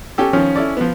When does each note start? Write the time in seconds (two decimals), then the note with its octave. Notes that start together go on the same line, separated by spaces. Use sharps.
0.18 C#4 G4 A4
0.33 D#3 F3 C#4
0.56 E4 A4 D5
0.77 F3 B3